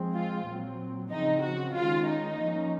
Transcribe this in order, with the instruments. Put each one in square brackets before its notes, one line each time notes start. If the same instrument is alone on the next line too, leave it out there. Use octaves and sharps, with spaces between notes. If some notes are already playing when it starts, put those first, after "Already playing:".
Already playing: [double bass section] F3 G#3 C4
[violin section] F4
[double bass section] A#2 F#3 C4
[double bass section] C#3 F3 C4 [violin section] D#4
[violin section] F#4
[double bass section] D#3 G#3 C#4 [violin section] F4
[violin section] D#4
[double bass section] F3 A#3 C#4